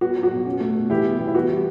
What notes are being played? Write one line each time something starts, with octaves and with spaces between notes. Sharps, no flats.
B3 F#4
F#3
F#4
B2
C#4
A3
B2
E3 E4 G4
B3
E3
E4
B3 F#4
G3